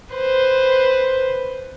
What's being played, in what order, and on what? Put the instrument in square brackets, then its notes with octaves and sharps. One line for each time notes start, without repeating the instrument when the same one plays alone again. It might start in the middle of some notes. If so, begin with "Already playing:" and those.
[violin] B4 C5